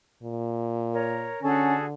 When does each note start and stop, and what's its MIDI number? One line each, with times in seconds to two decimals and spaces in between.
0.23 1.31 46
0.93 1.41 70
0.93 1.41 73
1.43 1.94 50
1.43 1.75 61
1.43 1.84 66
1.43 1.84 68
1.43 1.84 69